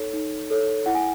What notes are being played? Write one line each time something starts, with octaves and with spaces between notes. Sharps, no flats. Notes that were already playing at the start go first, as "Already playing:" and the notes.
Already playing: D#4 A4 C#5
D#4
A4 C#5
E4 F#5
G#5